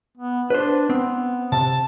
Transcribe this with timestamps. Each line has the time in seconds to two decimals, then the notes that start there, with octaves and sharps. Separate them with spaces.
0.18 B3
0.50 D4 B4 C5
0.90 B3 C4
1.52 C3 A5